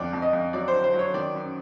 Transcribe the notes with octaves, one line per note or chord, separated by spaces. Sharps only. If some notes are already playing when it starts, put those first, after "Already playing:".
Already playing: F2 D3 D5
F2
D#5
F2
F#3 D5
C5
D3
C5
F#3
C#5
D#3 D5
F#2